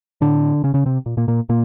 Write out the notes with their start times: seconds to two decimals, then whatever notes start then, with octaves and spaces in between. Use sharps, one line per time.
0.21 A2 D3 D4
0.64 C#3 C#4
0.74 C#3 C#4
0.86 C3 C4
1.06 A#2
1.17 A#2 A#3
1.28 A#2 A#3
1.49 A#2 A#3